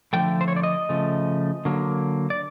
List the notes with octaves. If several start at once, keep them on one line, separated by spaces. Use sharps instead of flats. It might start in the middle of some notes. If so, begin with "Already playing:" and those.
D3 F3 A3 G5
C5
C#5
D5
D#5
C#3 F3 A3
D3 F#3 A#3
D5